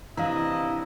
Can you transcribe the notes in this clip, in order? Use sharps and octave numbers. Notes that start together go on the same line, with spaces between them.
C3 E3 D4 E4 D#5 F5 A#5